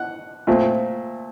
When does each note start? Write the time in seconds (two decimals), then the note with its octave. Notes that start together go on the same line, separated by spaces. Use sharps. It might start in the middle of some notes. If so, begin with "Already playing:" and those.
Already playing: F#5
0.47 A#2 A3 C4